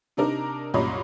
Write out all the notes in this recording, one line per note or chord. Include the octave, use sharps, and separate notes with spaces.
C3 D4 D#4 A#4 F6
C2 F#2 A#2 C#5 D#5 B5